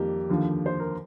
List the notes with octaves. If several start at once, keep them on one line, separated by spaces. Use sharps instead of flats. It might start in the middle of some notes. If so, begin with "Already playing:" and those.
Already playing: F2 D#3 G3 A#3 G4
D#2 D3 F3
C5
A#4